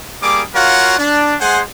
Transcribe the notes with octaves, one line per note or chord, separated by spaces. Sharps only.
G3 A#3 G#4 D6
F4 F#4 A#4 C#5 F5 F#5
D4
G#3 G#4 C5 F#5 G#5 C6